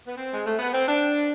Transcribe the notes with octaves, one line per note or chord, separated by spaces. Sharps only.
B3
C4
G#3
A3
B3
C4
D4